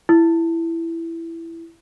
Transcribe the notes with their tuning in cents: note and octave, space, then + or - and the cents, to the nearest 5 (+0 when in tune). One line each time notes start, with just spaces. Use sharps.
E4 +10